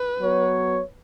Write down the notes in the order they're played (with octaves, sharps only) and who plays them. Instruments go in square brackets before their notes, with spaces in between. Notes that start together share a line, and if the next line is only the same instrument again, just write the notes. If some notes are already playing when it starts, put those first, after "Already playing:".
Already playing: [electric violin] B4
[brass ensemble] F#3 B3 F#4 C#5